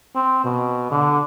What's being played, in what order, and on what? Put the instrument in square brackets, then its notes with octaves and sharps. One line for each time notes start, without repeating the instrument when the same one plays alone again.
[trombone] C4
B2
D3